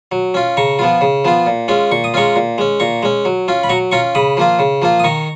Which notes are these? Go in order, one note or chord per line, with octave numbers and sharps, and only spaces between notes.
F#3
C#4 F4
C#3 A#5 C#6
F3 B3 F4
C#3
F3 B3 F4
A#2
G#3 C#4 F4
A#2 C#6
D#6
G#3 C#4 F4 A#5 C#6
A#2
G#3 C#4
A#2 A#5 C#6
G#3 C#4
F#3
C#4 F4
B5
F#3 A#5 C#6
C#4 F4 A#5 C#6
C#3 B5 D#6
F3 A#3 F4
C#3
F3 A#3 F4
D#6
D#3 A#5 C#6